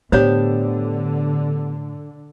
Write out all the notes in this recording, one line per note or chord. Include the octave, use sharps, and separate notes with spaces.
A2 D3 B3 D4 G4 C5 C#5